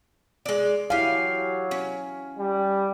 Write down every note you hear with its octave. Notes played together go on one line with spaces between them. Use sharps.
G#3 D5
F#3 E4 G4 F5 G#5
C#4
G3